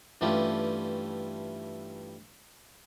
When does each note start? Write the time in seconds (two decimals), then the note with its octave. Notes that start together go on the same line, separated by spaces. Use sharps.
0.21 G2 E3 A3 C#4 F4 G4